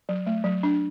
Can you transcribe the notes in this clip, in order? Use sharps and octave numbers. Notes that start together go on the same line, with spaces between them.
F#3
A3
F#3
D4